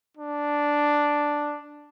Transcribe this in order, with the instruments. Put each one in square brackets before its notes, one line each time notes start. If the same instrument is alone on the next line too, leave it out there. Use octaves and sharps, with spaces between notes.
[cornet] D4